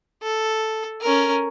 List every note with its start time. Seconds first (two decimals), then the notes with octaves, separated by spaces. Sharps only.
0.22 A4
1.01 C#4 A#4